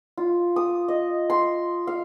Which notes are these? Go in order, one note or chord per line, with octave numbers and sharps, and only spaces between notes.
F4
D#6
D#5
C6
F5